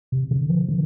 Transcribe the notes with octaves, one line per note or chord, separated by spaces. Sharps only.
C3
D3
F3
D3